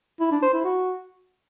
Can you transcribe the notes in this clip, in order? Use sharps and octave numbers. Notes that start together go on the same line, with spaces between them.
E4
D4
C5
E4
F#4